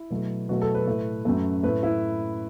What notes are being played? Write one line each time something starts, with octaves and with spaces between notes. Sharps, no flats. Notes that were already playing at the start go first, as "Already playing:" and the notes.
Already playing: E4
B2 F#3 A3
B2 F#3 A3 F#4
A4
B4
A2 A3
F#2 F#3 A3
A2 A3 B4
E4